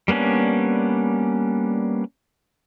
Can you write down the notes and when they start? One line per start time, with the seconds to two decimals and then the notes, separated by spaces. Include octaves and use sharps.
0.08 G3 A#3 B3 C#4 D4